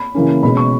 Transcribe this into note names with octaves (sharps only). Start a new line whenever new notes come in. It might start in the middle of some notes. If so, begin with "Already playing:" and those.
Already playing: B5
C#3 E3 A#3 C#4
B2 G#3 C#4 B5
C#6